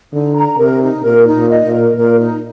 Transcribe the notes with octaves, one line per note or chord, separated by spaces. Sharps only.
D3 D#4
A#5
C3 A#4
D#4
A#2 A#4
D#4
A#2
D#5
A#2
A#4
A#2 A#4
D#4